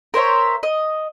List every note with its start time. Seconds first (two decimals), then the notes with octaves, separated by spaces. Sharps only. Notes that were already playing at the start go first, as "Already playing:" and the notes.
0.14 A#4 C5 C#5 E5
0.63 D#5